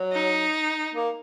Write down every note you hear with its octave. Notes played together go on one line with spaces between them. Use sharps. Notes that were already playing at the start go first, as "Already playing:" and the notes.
Already playing: F#3
D#4
A#3